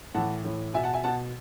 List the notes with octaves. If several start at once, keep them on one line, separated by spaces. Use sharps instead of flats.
A2 E3 F#5 A5
A2 E3
B2 E5 G#5
F#5 A5
E5 G#5
B2 F#5 A5